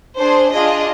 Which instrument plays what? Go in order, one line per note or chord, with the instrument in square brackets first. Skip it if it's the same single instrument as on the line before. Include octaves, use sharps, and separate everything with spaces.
[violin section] D4 G#4 C5
D4 F4 G#4 D#5